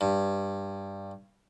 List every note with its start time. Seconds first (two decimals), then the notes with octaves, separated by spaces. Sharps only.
0.01 G2